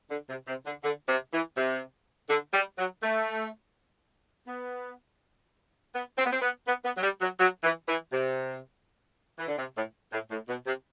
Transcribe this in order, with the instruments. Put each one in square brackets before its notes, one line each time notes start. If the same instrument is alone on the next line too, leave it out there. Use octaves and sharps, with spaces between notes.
[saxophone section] D3
C3
C3
D3
D3
C3
E3
C3
D3
G3
F#3
A3
B3
B3
C4
B3
C4
B3
B3
B3
F#3
G3
F#3
F#3
E3
E3
C3
E3
D3
C3
A2
A2
A2
B2
C3